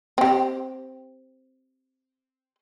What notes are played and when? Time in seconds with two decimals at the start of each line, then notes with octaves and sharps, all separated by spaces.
0.18 C4 G4